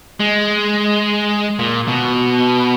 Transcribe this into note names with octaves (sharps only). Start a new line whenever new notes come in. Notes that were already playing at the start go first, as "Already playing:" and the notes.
G#3
A#2
B2